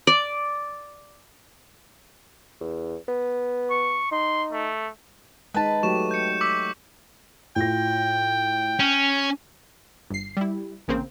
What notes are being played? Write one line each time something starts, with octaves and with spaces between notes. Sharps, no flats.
D5
E2
B3
C#6
D#4 C6
A3
G#3 D#4 B4 A5
F#3 A3 G4 C#6 E7
G6 C#7
D6 E6 B6
A2 F4 G5 A#6
C#4 D#7
G1 C7
G3 E4
A1 C#3 A#3 C4